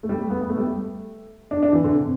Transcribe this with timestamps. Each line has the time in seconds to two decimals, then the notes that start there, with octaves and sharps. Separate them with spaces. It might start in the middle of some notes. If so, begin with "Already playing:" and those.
0.03 A3
0.09 G3
0.20 A3
0.30 B3
0.42 B3
0.49 A3
0.57 G3
0.65 A3
1.51 D4
1.63 D4
1.73 E3
1.84 D3
1.95 C3